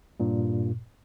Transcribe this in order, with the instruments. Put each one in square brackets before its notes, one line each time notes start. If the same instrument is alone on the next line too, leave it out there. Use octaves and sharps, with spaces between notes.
[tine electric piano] G2 A#2